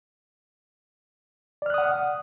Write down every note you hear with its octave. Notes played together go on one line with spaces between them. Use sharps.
D5 F#5 D#6 F6 F#6